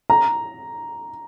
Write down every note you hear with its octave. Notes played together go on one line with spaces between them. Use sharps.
A#5